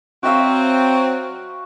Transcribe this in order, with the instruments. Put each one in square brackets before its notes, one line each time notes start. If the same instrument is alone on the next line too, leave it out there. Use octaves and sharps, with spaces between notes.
[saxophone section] F#3 C4 [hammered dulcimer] F#4 E5 F5